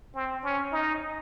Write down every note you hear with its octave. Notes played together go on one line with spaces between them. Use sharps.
C4
C#4
D#4